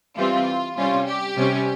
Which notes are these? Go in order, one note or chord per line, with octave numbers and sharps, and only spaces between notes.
E3 G3 C4 F4
C3 G3 C#4 F4
G4
C3 G3 C#4